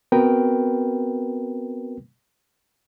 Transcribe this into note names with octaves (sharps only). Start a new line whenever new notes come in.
B3 C4 F#4 A#4 B4 G5